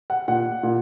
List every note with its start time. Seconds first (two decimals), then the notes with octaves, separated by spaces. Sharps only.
0.10 F#5
0.28 A#2 F#5
0.63 A#2